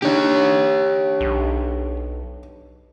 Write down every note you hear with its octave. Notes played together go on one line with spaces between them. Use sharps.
D3 D4 D#4 G4 C#5
B1